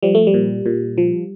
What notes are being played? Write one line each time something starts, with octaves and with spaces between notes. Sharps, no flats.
F3 G3
A3
G3
A#2
A#2
F3